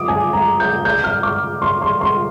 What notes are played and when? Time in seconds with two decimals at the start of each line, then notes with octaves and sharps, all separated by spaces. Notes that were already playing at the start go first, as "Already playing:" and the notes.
Already playing: D6 D#6
0.08 G#5
0.33 A#5
0.60 G6
0.85 G6
1.04 F6
1.23 D6
1.62 C6
1.82 C6
2.01 C6